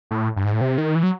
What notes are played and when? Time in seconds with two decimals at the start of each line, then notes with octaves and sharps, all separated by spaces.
0.11 A2
0.36 G2
0.45 G#2
0.53 A2
0.61 C3
0.78 D#3
0.95 E3
1.03 F#3